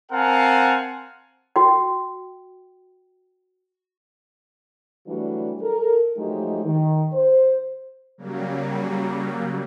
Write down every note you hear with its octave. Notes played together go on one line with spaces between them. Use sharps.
C4 A#4 F5 F#5 G#5 A5
F#4 G5
E3 F#3 G3 A3 D4 F#4
A4 A#4
F3 F#3 G#3 A3 D#4 G4
D#3
C5
C#3 F#3 G3 A#3